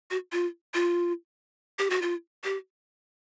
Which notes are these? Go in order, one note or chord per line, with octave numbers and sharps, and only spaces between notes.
F#4
F4
F4
G4
F#4
F4
G4